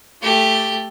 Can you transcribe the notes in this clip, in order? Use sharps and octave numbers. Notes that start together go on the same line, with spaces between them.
A3 G4